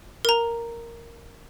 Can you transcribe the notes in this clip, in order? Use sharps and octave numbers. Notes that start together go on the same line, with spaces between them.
A#4 A#5